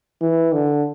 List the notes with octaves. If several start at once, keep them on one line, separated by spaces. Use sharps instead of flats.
E3
D3